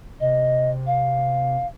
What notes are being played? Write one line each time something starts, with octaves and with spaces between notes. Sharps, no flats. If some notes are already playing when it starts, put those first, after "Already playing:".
C3 D#5
F5